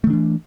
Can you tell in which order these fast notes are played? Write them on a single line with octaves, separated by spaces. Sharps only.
A3 D#3 D4 E3